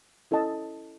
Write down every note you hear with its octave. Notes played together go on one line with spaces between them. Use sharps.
C#4 E4 A4 D#5 A5